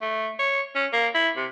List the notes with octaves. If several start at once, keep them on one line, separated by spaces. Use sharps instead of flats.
A3
C#5
C#4
A#3
E4
C3